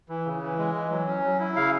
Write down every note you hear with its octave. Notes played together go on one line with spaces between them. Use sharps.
E3
C#3
E3
G#3
E3
F#3
C#4
F#3
E4
C#3 F5